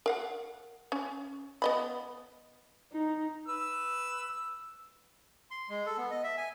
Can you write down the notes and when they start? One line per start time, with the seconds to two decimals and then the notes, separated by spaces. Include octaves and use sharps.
0.06 A#4 F5 F#5
0.92 C#4
1.62 B3 D#5 B5
2.92 D#4
3.47 B4 E6
5.51 C6
5.69 G#3
5.86 A4
5.97 B3
6.11 D#5
6.23 E5
6.37 G#5